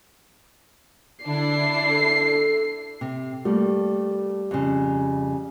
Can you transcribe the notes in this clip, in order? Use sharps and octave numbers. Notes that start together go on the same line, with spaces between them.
D3 D4 E4 C7
A4
C3
G3 A3 A#3
F2 C#3